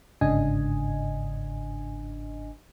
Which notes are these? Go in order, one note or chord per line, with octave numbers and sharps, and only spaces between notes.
G1 G#2 C#3 D4 D#5 G#5